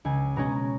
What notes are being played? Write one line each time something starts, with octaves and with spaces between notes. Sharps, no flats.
C#2 G#5
B2 G#3 C#4 A#5